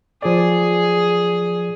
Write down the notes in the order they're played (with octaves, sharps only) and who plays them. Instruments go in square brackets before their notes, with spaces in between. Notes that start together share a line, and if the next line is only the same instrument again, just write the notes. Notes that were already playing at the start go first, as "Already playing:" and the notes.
[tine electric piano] F3 D5 [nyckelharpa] G#4